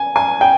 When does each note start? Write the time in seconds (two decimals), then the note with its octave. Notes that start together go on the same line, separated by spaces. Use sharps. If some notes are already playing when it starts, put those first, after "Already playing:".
Already playing: G#5
0.16 G#5
0.41 G5